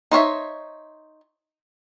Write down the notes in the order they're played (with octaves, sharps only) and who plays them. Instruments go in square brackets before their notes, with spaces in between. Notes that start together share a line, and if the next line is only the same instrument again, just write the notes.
[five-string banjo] D#4 C5 C#5 E5